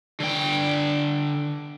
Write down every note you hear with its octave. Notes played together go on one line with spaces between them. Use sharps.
D3 G5